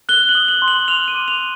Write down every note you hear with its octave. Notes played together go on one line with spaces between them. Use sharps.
F#6 G7
F#7
D#6
F#7
C6
F#7
F6 F7
D#7
D6
F7